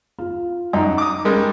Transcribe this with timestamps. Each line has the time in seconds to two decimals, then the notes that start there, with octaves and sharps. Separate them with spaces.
0.18 F4
0.73 F#2 D#4 D#5
0.98 D6 D#6
1.25 G3 G#3 A#4